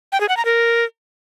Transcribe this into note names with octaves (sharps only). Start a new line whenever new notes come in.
G5
G#4
F#5
A#5
A#4